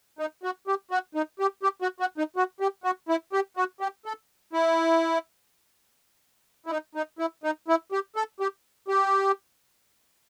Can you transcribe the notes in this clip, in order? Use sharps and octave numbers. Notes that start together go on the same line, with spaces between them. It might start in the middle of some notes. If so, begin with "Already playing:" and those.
D#4
F#4
G4
F#4
D#4
G4
G4
F#4
F#4
D#4
F#4
G4
F#4
E4
G4
F#4
G4
A4
E4
E4
D#4
D#4
E4
D#4
E4
G4
A4
G4
G4